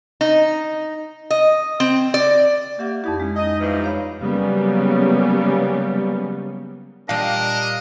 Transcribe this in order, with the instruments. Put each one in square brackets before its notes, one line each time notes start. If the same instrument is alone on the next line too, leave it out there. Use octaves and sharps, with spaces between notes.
[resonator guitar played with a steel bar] D#4
D#5
C4
D5
[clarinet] A#3 [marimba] G4 E5 F#5
[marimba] F2 D#4 G4 [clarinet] E4
[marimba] G#3 [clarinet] C#4
[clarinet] D#4 [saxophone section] D#5
[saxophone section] G2 E3 F3
[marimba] C#5 F5 B5
[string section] C#3 F#3 G3 A#3 B3 C#4
[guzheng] A#2 G3 [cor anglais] D4 [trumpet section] A#4 D#5 [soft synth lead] F5